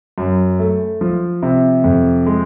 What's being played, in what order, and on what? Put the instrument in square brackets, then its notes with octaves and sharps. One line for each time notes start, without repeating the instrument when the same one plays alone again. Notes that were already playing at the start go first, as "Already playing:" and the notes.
[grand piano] F#2
A3
F3
C3
F2
G#3